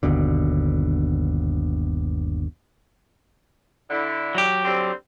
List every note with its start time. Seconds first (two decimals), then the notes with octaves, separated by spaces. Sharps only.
0.03 G1 D#2 B2 D3
3.90 D3 E4
4.35 F#3 G4
4.64 D3 G3 C4